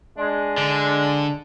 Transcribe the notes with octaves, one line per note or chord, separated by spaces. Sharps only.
G#3 D4
D3